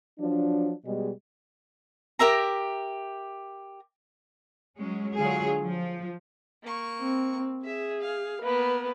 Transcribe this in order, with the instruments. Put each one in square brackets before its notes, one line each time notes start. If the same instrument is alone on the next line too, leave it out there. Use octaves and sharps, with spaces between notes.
[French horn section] F3 F#3 D4
B2 G3 G#3
[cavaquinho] G4 A#4 E5 A#5
[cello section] F#3 G#3 C#4
D3 F#3 G#3 F4 G#4
F3
[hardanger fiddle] A#3 C#6
[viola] C4
[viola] G#4 [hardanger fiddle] E5
[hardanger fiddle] F5
[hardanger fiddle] A#3 B3 [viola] B4